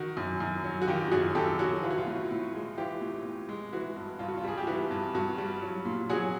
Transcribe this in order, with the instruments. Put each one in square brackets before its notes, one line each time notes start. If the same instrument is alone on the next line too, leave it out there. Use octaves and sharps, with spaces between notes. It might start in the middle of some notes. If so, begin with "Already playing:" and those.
Already playing: [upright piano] D#3 F#4
F#2
F#2
F#3
F#4
D#3 F4 G4
F#2 F#4 G#4
F#2 G4 A4
F#3 F#4
E3 F4
F#4
F4
A2
A2
G#3
E3 F4 G4
A2
A2
G#3
E3 F#4
G2
G2 F4
F#4
F4
G3 G#4
G4
E3 F#4
G2
G2 F#4
G3
F#3
A#2
F#3 F#4 G#4